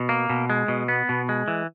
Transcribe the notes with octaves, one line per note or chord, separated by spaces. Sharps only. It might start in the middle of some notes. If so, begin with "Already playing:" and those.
Already playing: B2
A#3
B2
G#3
B2
B3
B2
G#3
E3